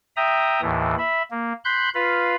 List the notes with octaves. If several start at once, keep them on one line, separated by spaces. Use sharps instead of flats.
E5 G5 A#5 D#6
D#2 A2 E3
E5 B5
A#3
B5 C6 F#6 G6
F4 B4 F5 B5